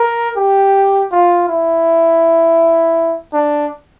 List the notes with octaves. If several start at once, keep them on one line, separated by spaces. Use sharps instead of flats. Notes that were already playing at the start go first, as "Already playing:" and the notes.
Already playing: A#4
G4
F4
E4
D4